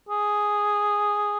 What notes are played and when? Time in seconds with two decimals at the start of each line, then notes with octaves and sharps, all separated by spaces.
0.09 G#4